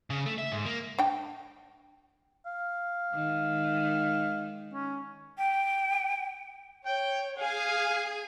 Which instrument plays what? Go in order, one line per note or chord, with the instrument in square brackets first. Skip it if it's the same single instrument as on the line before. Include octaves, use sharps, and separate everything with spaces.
[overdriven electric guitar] C#3
A3
E5
G#2
A#3
[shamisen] D4 G5
[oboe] F5
[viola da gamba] D#3 G#3
[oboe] C#4
[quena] G5
[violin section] C#5 [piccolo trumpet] G5
[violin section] G#4 G#5 [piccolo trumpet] F5